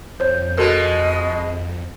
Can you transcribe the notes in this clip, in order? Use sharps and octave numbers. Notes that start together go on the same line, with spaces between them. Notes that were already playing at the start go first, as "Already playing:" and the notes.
F2 C5 C#5 G6
B2 G#3 F#4 A4 A#4 D#5